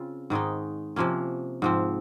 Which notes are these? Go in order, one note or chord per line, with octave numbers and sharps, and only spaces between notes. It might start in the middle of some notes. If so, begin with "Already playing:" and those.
Already playing: C#3 C4 F4
G#2 D#3 G#3 D#4
C3 F3 A#3 C#4
G#2 F3 C4